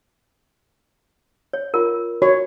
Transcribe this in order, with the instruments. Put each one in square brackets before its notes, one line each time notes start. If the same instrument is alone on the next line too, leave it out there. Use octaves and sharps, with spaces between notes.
[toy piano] C#5
F4 A#4
[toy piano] F#4 [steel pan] C#5